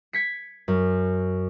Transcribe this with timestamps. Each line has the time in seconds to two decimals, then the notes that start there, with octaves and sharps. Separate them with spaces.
0.13 G#6 B6 C#7
0.68 F#2